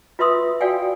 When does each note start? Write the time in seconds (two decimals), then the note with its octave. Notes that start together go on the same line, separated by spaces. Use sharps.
0.19 F4 B4 E5 C6 D#6 E6
0.61 F#4 D5 F5 G5 G#5